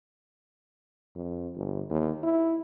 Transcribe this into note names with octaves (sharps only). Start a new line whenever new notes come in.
F2
G1
D#2
E4